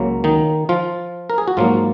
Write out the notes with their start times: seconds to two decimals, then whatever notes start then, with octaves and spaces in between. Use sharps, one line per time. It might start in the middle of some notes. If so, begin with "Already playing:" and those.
Already playing: C#2 C#3 F#3 A#3
0.24 D#3 D#4
0.69 F3 F4
1.30 A#4
1.38 G#4
1.48 F#4
1.57 G#2 F3 F#3 A#3 F4